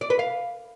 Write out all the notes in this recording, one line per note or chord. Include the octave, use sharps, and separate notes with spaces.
D5
B4
F5